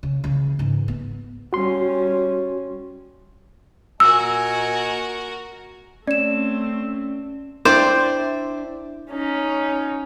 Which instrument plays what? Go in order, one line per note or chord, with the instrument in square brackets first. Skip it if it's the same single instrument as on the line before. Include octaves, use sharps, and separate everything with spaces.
[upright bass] C#3
C#3 E3
G#2 E3
B3
[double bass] G3 C#4 [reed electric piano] F#4 C6
[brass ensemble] A#2 D#5 G#5 [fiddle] F#4 A#4 [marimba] E6
[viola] A3 C4 [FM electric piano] C#4 [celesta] D5 E7
[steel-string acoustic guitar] D4 E4 E5 [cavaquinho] C5 D5 G5
[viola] C#4 D#4